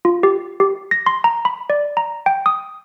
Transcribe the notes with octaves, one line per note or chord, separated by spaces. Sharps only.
F4
G4
G4
A#6
C6
A#5
B5
D5
A#5
G5
D#6